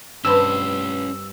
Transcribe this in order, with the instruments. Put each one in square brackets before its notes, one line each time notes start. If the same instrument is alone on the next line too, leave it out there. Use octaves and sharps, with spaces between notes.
[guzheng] G2 C4 [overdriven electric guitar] C#4 B4 [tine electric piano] E6